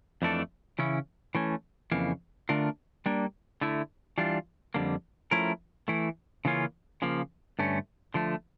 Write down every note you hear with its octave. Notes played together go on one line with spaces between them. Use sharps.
F2 E3 A3 D4 A4
C#3 E3 C#4 E4
E3 A3 C#4
F2 C#3 E3 A#3
D3 A3 D4 F4 A#4
G3 A#3 D4
D3 A3 E4
E3 G3 D4 F4
F2 D3 G3 A#3
F3 A3 C#4 E4 A#4
E3 A3 E4
C#3 E3 A#3 C#4 F4
C#3 F3 A#3
G2 D3 A3 C#4
D3 F3 A3